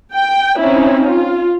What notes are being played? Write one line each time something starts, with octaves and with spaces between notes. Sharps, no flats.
G5
C4 C#4 D#4 E4
F4